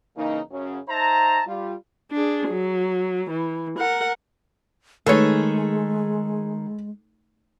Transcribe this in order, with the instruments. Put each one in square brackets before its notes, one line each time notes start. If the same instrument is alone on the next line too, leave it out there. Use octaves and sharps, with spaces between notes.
[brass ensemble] C#3 E3 A#3 D#4
F#2 C#3 F#3 C#4
D#4 C5 E5 A5 A#5
G3 F4
[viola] D4 G#4
F#3
E3
A#4 F#5
[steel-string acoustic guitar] D#3 G#4 [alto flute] G#3 [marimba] A3 D#4 [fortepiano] A4 B4 C#5